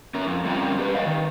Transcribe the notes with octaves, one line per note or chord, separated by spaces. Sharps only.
C#4 A#4
F2
G3 C4 C#4 A#4
G4 B4
G4 A#4 B4 C#5 D#5 F5
D#3